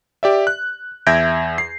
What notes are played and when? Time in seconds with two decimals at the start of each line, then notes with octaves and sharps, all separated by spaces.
0.23 G4 D5 E5
0.47 F#6
1.07 E2 E5 G6 G#6 A#6 D7
1.58 C7